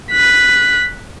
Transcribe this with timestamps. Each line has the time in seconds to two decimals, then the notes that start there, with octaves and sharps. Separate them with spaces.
0.11 F#6 B6